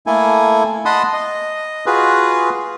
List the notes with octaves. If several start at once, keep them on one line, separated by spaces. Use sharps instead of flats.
A3 A#3 E4 A4 G#5
D#5 F#5 A5 B5 C6 D#6
D#5
F4 F#4 G#4 B4